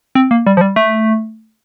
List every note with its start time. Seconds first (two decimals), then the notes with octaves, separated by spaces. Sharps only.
0.15 C4
0.31 A#3
0.46 G3
0.57 F3
0.61 G3
0.76 A3